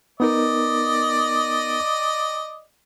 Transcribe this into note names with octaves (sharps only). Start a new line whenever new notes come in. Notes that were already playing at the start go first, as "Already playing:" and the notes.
B3 D#4 A#4 D5 D#5